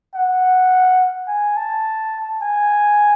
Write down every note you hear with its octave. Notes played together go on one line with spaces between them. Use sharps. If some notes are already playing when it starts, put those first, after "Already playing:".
F#5
G#5
A5
G#5